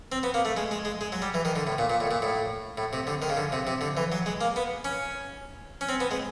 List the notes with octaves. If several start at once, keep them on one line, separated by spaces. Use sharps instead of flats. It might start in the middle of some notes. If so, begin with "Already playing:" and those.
C4
B3
A#3
A3
G#3
G#3
G#3
G#3
F#3
G3
E3
D#3
D3
A2
A#2
A#2
A2
A#2
A2
A2
C3
D3
D#3
C#3
D3
C3
C3
D3
E3
F#3
G#3
A#3
B3
C#4
C#4
C4
B3
G#3